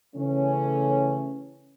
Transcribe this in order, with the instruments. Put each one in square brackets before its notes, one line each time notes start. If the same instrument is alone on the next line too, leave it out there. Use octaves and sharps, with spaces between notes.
[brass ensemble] C#3 E3 A3 C#4